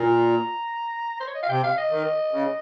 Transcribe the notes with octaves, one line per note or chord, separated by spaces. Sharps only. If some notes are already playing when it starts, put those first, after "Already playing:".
Already playing: A#2 A#5
C5
C#5
D#5
F5
C3 G5
F5
D#5
D#3
C#3